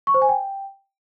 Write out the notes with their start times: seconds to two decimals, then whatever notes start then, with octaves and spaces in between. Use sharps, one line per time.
0.07 C#6
0.14 C5
0.22 G#5
0.29 G5